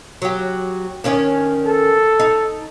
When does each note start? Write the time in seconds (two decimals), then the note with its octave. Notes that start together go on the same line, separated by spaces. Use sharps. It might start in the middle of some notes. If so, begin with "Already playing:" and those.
0.22 F#3 G4
1.04 D#3 C#4 D4
1.66 A4
2.20 D#4